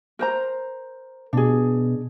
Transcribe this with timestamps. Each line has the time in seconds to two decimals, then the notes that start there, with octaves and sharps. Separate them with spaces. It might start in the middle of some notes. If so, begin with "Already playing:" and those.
0.19 A#4 C5 A#5
1.33 B2 D4 G#4